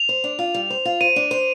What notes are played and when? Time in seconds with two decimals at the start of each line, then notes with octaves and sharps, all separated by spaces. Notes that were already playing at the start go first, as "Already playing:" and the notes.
Already playing: F7
0.09 C5
0.24 D4
0.39 F4
0.54 G3
0.70 C5
0.85 F4
1.01 C5 D#7
1.16 D4
1.31 C5